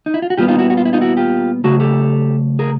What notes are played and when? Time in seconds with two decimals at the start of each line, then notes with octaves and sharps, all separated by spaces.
0.06 D#4
0.14 E4
0.22 F4
0.30 F#4
0.37 A#2 G3 B3 F4 G4
0.48 D#4 F4
0.59 E4 F#4
0.70 F#4
0.77 F4
0.85 E4
0.93 D#4 F4
1.01 E4 F#4
1.17 F4 G4
1.64 C#3 F#3 A3 F#4 G#4
1.80 G4 A4
2.59 G#4 A#4